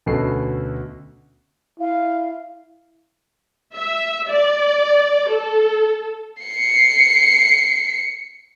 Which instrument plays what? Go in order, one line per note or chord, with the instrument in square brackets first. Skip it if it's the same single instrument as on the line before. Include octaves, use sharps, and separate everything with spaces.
[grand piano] D2 B2 C#4 F#4 A4 C7
[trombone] E4 [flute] F5
[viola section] E5
D5
A4
[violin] C7 C#7